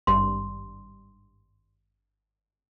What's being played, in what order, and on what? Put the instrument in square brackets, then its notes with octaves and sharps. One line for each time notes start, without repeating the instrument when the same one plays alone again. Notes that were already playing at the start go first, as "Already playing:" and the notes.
[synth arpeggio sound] G#1 G2 G3 [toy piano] C6